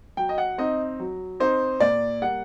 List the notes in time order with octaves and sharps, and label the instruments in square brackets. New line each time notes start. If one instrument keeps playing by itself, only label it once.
[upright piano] F#3 G5
D#5
F#5
C4 D#4 D#5
F#3
C4 D#4 C5
A#2 D5
G3 A#3 F#5